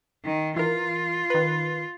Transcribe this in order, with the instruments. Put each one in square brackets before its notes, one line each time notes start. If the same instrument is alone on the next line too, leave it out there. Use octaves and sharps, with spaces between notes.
[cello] D#3
[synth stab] E3 A#4 [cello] F4
[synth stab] D#3 B4